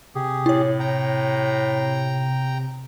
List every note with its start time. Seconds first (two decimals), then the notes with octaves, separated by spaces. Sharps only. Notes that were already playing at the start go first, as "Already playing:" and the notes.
0.15 C3 G4 G#4
0.46 A2 E4 C#5
0.80 G5 A#5